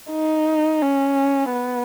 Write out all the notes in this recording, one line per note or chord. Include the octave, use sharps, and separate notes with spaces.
D#4
C#4
B3